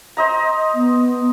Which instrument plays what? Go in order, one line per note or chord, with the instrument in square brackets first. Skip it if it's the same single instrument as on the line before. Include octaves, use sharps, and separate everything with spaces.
[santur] C5 D#5 A#5
[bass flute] B3